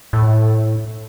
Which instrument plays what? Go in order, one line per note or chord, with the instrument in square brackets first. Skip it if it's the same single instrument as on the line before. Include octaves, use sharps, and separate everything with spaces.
[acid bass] A2